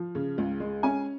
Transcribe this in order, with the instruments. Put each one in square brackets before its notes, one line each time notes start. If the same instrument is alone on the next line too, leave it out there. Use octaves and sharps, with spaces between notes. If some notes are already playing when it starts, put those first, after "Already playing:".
Already playing: [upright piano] F3
C#3
C#2
G#3
C#4 G#5